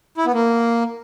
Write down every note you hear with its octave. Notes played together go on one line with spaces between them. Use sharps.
E4
B3
A#3